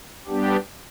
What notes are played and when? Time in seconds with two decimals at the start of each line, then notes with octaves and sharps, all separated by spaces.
0.27 G3 B3 D4 G4